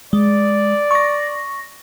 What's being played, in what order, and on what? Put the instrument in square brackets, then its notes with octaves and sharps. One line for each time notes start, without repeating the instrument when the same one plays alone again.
[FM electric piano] G#3 [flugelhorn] D5
[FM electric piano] C#6 A#6